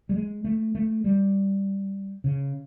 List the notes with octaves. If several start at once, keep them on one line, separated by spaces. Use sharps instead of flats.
G3
G#3
A3
A3
G3
C#3